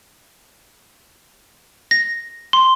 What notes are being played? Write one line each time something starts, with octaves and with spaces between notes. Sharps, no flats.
A#6
C6